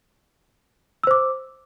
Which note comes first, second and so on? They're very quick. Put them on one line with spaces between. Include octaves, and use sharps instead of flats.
E6 C5 D6